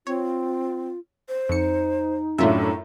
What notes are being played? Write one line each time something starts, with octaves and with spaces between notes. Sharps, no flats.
C4 F4 C#5
C5
F2 D#4 C#7
F#2 A2 A3 D4 F4 E5